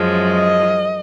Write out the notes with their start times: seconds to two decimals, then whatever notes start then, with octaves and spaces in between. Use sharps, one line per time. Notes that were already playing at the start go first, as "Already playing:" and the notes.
Already playing: F#2 F3 G#3
0.37 D#5